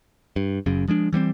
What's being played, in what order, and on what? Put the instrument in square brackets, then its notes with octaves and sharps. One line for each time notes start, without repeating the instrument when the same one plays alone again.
[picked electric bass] G2
F#1 F#2 C#3
F3 G#3 D4
E3 G3 B3 C4